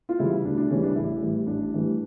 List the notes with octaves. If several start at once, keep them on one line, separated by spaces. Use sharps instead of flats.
F4
C#3 E3 G3 E4
D2 D4
D4
C#3 E3 G3 C#4
D4
A1 E4
A2 E3 G3
A1 D4
A2 E3 G3